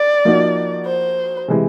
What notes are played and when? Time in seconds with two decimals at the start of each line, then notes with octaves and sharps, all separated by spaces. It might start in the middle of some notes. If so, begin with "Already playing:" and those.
Already playing: D5
0.25 F3 A#3 D#4 F#4
0.86 C5
1.48 C3 E3 G#3